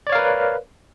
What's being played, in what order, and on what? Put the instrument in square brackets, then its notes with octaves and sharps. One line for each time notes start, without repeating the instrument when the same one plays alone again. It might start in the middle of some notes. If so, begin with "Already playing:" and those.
[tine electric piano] D5
C#5
F5
A#4
B4